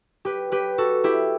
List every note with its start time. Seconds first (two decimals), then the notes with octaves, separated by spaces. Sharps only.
0.25 G4 B4
0.52 G4 B4
0.78 F#4 A4
1.04 E4 G4